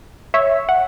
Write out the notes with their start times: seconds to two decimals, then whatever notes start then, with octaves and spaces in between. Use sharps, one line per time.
0.34 C#5 E5
0.69 F#5